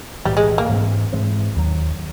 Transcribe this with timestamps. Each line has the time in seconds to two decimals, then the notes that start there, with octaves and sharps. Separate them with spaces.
0.25 B1 A2 E3 G3
0.37 G#3
0.58 A#3
0.69 G#2 E3 G#3 C4
1.13 G#2 E3 G#3 C4
1.56 D#2 D#3 F#3